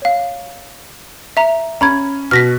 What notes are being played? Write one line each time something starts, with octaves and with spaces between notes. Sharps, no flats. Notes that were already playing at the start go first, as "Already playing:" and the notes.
C#5 F5
E5 A#5
C#4 A#5 B5 G#6
B2 F6 A#6 B6